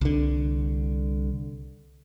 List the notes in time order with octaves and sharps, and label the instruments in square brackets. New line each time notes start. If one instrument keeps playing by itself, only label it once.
[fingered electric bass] C2 D3